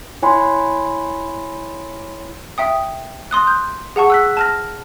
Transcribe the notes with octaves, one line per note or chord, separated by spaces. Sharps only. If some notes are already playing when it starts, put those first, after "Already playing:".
E4 C#5 G#5 B5 C6
E5 G5 D#6
C6 D#6 F#6
G6
G#4 F#5 A5 C#6
E6 F#6 B6
A5 F6 A#6